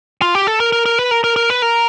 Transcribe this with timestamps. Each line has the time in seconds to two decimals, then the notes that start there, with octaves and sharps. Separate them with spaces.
0.22 F4
0.35 G4
0.47 A4
0.60 A#4
0.73 A#4
0.86 A#4
0.99 B4
1.11 A#4
1.24 A#4
1.36 A#4
1.50 B4
1.62 A#4